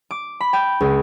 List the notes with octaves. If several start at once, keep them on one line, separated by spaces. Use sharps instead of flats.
D6
B5
G5
C#2